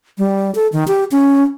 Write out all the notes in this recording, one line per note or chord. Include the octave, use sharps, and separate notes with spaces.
G3
A4
D#3
G4
C#4